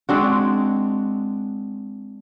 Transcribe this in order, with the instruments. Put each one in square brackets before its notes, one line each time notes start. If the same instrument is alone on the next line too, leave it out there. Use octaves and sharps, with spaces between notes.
[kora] G#3 C4 D4 F#4